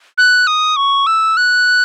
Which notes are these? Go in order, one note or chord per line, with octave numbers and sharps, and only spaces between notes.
F#6
D#6
C#6
E6
F#6